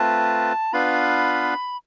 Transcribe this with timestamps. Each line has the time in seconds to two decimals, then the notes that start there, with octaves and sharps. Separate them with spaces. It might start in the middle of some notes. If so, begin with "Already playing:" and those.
Already playing: A3 C4 F4 B4 A5
0.73 B3 D4 F4 B4 F5 B5